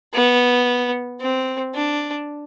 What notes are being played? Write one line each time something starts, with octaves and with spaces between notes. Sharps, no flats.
B3
C4
D4